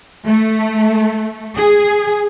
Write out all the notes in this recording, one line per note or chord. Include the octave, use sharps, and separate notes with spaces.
A3
G#4